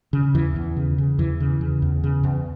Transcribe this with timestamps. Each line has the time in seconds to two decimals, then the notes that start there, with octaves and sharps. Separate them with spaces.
0.13 C#3
0.34 E2 E3
0.56 E2
0.77 C#3
0.98 C#3
1.18 E2 E3
1.40 C#3
1.61 C#3
1.82 E2
2.04 C#3
2.23 E2